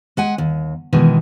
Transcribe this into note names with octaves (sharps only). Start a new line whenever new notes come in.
G#3 F#5 G#5
D#2
B2 D#3 E3 G#3